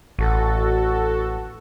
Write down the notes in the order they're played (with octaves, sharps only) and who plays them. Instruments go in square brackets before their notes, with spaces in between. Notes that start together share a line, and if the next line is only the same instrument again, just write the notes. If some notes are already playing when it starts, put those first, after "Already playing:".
[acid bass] A1 [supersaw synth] F#4 A4